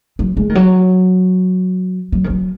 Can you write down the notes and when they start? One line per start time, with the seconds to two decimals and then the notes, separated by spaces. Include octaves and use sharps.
0.19 F#3
0.37 G#3
0.49 D#3
0.55 F#3
2.12 F#3
2.24 D#3
2.30 F#3